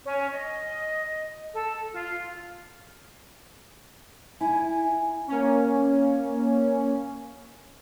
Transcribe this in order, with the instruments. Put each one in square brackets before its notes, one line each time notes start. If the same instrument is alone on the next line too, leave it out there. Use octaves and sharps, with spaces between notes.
[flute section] C#4
D#5
A4
F4
[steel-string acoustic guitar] E4 [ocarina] G#5
[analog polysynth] A#3 C#4